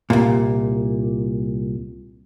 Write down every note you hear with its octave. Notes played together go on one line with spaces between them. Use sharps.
C2 A#2